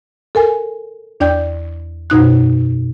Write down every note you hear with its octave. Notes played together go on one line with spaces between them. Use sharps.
A4 A#4 G#5
E2 D4 D5 G5 G6
F#2 B2 D#4 F#6